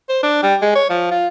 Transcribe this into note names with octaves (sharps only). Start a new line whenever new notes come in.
C5
D4
G3
G#3
C#5
F3
F4